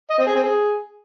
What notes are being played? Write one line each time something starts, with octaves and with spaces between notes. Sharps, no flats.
D#5
C4
G#4
C4
G#4